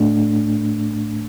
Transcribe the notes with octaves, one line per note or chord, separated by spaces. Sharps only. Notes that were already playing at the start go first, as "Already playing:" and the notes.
Already playing: A2 A3 D4